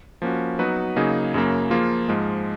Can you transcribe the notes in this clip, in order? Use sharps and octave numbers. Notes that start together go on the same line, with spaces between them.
F3 A#3 C#4 F#4
F#3 B3 D#4 F#4 B4
C#3 F#3 A#3 D#4 G#4
F#2 C#3 F#3 A#3
F3 A#3 F4 G#4
G#2 F3 G#3